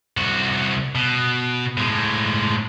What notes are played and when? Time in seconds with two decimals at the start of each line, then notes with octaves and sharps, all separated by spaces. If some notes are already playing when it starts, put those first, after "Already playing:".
0.17 C2 F#4
0.95 B2
1.77 A2 G#3